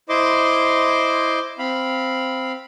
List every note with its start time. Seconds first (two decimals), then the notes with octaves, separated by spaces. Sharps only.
0.09 E4 C5 D#5 C6 D6
1.59 C4 F5 B5